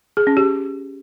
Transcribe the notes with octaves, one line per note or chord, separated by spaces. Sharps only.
G#4
C#4
G4